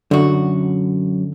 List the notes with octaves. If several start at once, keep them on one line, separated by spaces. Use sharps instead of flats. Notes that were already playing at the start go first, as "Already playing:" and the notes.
F#2 D3 F#4